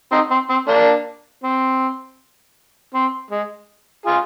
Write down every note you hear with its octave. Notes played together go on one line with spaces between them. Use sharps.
C4 D#4
C4
C4
A#3 D4
C4
C4
G#3
F4 G#4